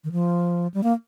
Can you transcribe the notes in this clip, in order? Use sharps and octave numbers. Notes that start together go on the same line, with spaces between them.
D#3
F3
G3
A#3